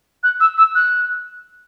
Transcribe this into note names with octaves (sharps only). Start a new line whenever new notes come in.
F#6
E6
E6
F#6